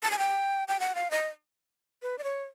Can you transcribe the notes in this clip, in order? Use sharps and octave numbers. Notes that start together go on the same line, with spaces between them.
A5
G#5
G5
G5
F#5
F5
D#5
B4
D5
C#5